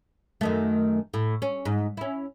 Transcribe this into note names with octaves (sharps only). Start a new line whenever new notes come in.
F#2 D#3 A3
A2
C#4
G#2
C#4 E4